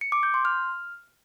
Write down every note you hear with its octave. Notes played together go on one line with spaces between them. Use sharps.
C#7
D6
G6
C6
F6